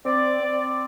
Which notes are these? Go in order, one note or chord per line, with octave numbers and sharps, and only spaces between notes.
C4 D5
C4